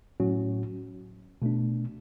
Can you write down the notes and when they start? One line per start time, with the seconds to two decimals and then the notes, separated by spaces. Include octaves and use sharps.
0.20 A2 F#3 C#4 F#4
1.42 B2 A3 D4